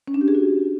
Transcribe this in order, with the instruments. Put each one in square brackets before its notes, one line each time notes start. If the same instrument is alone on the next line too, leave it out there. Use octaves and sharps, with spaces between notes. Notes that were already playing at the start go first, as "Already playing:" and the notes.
[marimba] C#4
D4
G4
G#4
F#4